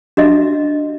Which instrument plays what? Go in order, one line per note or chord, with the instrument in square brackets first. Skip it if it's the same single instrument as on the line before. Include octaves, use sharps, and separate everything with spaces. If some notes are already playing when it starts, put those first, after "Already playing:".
[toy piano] D4 F#4 D#5 E5